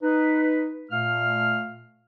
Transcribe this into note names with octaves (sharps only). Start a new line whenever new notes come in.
D#4 B4
A#2 A3 F5 F6